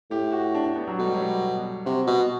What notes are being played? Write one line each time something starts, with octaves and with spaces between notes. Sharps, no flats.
A2 G4
F#4
D4
D4
B3
F#3
B2 A3
G3
F#3
G3
C3 F#4
B2